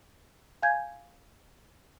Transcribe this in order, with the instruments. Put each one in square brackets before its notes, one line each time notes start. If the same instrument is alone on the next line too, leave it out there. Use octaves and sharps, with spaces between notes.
[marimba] F5 G#5 G6 G#6